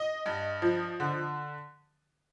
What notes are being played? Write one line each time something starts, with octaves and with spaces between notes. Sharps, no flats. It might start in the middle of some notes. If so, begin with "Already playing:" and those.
Already playing: D#5
G2
F3
D3